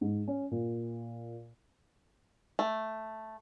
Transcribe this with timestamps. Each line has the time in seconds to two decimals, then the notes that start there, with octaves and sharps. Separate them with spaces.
0.01 G#2
0.28 C#4
0.51 A#2
2.59 A3